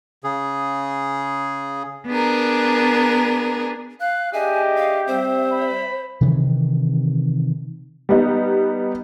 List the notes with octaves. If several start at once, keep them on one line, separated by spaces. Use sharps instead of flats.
C#3 G#4
B3 D4 G#4 A#4
F5 F#6
D4 G4 G#4 D#5 E5 G#5
F5
G3 C4 C5
B5
C3 D#3 E3
G3 B3 D#4